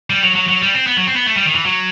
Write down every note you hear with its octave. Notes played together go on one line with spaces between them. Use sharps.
G3
F#3
F#3
F#3
G3
C4
B3
F#3
C4
B3
A3
G3
D#3
E3
F#3